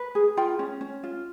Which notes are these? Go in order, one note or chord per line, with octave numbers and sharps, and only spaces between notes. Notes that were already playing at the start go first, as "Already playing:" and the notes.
Already playing: B4
G#4
F4 G5
C#4
C#4
F4